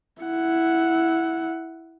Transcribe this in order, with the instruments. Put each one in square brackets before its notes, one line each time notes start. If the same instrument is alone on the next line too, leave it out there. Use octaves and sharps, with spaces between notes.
[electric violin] E4 F#5